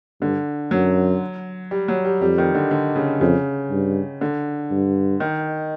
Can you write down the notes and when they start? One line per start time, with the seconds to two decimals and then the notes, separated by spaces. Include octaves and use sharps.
0.21 G2 D3
0.71 F#2 F#3
1.71 G3
1.88 F#3
2.05 G3
2.21 F2 G3
2.38 D#3
2.55 D3
2.71 D3
2.96 C#3
3.21 F2 C#3
3.71 G2
4.21 D3
4.71 G2
5.20 D#3